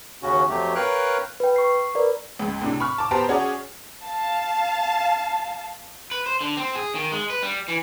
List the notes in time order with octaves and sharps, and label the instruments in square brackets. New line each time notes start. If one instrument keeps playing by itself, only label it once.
[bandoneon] D#2 C#3 C#4 F#4
F2 F#3 A3 G4
A#4 B4 C#5 F5 G5 F#6
[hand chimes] B4 G5
C#6 C7
A#4 B4 D5
[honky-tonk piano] C#2 G#2
A2 C3 D4
B5 C#6 F6
A5 D6
B3 G4 C5 G5 A5 A#5
C#4 F#4 G#4 C#5 D5
[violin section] F5 A5
[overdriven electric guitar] B4
C5
D3
C4
G#4
D#3
G#3
B4
G3
E3